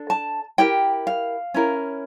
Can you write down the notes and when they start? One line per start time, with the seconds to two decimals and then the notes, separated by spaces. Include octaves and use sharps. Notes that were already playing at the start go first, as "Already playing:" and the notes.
Already playing: D4 A4
0.10 A5
0.58 E4 G4 A#4 G5
1.07 F5
1.54 C#4 E4 A#4